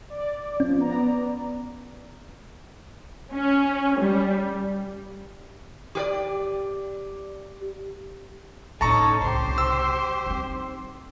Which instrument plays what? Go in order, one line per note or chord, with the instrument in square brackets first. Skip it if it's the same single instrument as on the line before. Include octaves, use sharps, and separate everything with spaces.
[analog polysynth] D5
[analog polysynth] F3 [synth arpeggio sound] C#4
[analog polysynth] B3 D5 A#5
[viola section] C#4
G3
[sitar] G4 A#4 D5
[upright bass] A2 D3 [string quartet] C#4 D#4 A4 [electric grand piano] A5 A#5 C#6
[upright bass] C2 C#3 [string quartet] G4 C5
[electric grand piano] E6
[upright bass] C4 D#4